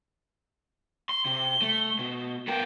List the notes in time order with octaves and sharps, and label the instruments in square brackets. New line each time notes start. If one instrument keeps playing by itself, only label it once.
[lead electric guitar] C6 [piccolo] G7
[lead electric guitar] C3
A3
B2
[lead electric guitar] B3 A#4 [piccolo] G5